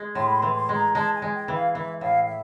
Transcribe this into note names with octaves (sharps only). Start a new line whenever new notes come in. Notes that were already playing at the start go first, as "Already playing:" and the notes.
Already playing: G#3
A2 C6
B5
C6
E3
C6
G#3
A#5
G#3 A5
G#5
G#3
G5
E3
F5
E3 E5
A2 F5
E5